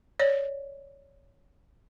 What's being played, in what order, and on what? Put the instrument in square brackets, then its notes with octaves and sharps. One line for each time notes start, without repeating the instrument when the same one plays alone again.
[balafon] C#5 D5